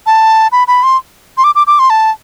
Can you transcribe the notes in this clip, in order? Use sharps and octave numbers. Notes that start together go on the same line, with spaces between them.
A5
B5
B5
C6
C6
D6
D6
D6
C6
A5